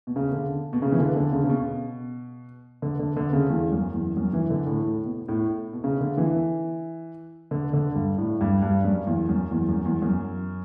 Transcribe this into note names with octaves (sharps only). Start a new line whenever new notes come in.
B2
C#3
D3
B2
C#3
E3
D3
D3
C#3
C#3
B2
D3
D3
D3
C#3
E2
F#2
E2
F#2
E3
D3
A2
A2
B2
A2
B2
C#3
D3
E3
D3
D3
G2
A2
G2
G2
F#2
E2
F#2
E2
F#2
E2
F#2